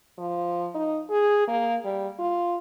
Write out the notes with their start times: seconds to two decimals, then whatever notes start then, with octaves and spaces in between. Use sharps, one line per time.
0.18 F3
0.75 D#4
1.10 G#4
1.48 A#3
1.85 G3
2.19 F4